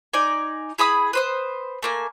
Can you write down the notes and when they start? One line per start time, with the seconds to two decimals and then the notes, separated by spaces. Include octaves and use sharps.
0.13 D#4 D5 G#5
0.78 E4 G#4 B5 D#6
1.13 B4 C5 D#6
1.83 A3 A#3 G#5